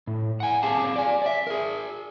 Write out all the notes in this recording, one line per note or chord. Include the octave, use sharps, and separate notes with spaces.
A2
F#5 G#5
C4 G4 G#4 F5 A5
D5 G#5
D5 E5
G#4 A#4